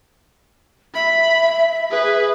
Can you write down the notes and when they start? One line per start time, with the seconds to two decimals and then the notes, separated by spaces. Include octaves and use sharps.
0.95 E5 B5
1.91 G#4 B4